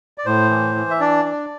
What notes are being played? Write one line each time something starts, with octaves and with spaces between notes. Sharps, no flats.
D5
A2 C5
E3
E3
E5
D4 D5
D4